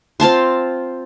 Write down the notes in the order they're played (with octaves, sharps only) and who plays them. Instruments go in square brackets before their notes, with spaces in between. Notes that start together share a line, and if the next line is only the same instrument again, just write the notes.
[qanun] C4 F4 A5 C6